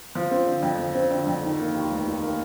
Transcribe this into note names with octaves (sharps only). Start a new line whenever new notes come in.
F3
C4
D3
F2
F3
C4
D3
F2
D#3
A#3
D#2
F1
D#3
A#3